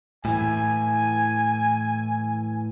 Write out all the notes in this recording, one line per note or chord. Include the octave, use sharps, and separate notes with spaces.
A2 E3 G#5